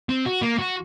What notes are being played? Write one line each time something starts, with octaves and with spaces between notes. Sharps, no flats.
C4
F#4
A#3
F#4